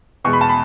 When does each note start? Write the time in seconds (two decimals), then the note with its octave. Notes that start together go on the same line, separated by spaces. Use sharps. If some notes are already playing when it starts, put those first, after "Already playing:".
0.24 E2 B2 G#3 C#6
0.33 B5
0.41 A5
0.49 B5